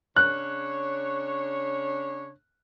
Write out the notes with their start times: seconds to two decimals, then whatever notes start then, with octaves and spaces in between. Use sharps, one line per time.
0.16 C#3 D4 C#5 F#6